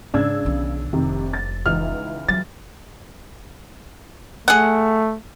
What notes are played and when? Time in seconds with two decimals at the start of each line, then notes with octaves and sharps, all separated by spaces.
0.14 G#2 C#3 D4 E6 G#6
0.45 B1 D#3
0.93 F1 C3 D#3
1.33 A6
1.66 C#2 E3 D#4 F6
2.29 F#3 A6
4.48 A3 G#4 F#5